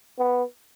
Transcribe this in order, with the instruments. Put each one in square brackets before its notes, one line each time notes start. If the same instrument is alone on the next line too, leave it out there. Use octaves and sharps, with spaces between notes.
[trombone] B3